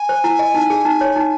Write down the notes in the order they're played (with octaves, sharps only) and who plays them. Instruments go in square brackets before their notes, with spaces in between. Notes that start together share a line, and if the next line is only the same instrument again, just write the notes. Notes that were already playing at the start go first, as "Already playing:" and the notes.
Already playing: [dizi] G#5
[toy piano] C5
E4
D#5
D#4
G#4
D#4
C#5
D#4